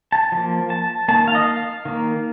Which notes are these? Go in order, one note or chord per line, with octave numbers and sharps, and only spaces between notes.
A5
F3 A#3
A5
D#3 A#3 A5
F5
D#5
F5
D#3 A#3